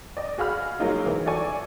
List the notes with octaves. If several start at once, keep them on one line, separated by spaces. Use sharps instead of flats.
D5 D#5
F#4 G#4 F5 B5 F6
F#3 G#3 A#3 D#4 F4
E3
E4 F#4 A4 D5 G#5 C#6